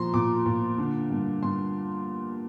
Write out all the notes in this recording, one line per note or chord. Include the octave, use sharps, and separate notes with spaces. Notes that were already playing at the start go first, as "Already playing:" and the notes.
Already playing: A#2 F3 A#5 C6
A#2 D6
A#2
D3
G2
G2 C6